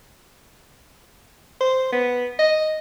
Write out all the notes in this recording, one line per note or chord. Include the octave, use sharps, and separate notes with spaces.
C5
B3
D#5